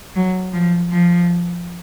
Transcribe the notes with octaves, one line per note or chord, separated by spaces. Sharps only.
F#3
F3
F3